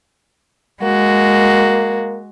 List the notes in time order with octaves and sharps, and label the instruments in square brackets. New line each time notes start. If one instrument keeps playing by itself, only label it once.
[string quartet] G#3 F#4 [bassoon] A#3